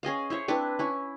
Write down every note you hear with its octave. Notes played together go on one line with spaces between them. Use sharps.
C#4 G#4 D#5 F5
E4 C5 C#5
C4 D4 E4 B4
C#4 E4